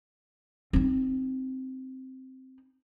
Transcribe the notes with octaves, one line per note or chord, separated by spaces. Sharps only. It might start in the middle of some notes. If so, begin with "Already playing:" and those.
C4 D#4